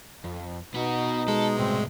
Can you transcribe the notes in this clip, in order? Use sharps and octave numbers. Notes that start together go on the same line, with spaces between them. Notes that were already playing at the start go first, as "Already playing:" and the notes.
F2
B2 B3 D#4 F#4
G#3 A4
C2 A2 C4